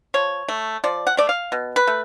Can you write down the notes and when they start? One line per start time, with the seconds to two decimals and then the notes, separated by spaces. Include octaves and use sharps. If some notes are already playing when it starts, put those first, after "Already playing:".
0.14 F3 C#5
0.49 A3
0.84 F3 D5
1.07 F#5
1.17 A3 D5
1.29 F5
1.52 B2
1.76 B4
1.87 A3